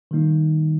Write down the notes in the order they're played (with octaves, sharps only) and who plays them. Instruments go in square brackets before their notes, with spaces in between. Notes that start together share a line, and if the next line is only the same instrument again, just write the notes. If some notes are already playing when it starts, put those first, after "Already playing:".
[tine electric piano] D#3 G3 A#3 D#4